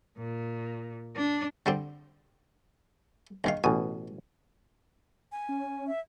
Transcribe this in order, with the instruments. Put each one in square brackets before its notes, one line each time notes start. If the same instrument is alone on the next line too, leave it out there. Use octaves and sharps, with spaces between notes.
[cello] A#2
D4
[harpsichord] D3 G3 C4
A#1 D#3 F5
[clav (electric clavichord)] A1 B2 [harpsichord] G#5
[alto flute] G#5
[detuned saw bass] C#4
[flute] E5